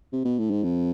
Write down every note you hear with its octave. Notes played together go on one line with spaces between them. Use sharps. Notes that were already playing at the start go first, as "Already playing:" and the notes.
C3
B2
A2
G#2
F2